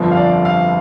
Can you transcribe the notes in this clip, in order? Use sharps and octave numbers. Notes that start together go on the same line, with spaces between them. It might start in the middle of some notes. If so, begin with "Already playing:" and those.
Already playing: G1 F2 D3 F3
F5
D5
F5